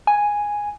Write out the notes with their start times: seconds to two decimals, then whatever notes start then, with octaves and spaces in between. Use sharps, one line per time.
0.07 G#5